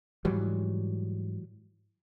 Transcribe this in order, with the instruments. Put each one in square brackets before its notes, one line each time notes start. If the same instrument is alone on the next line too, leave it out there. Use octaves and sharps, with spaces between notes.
[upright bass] G#2 [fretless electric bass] E3 F#3 G3